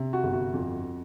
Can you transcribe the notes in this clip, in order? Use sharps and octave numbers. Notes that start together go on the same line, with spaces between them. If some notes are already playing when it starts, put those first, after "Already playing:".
Already playing: C3
F#4
G1
F#4
F2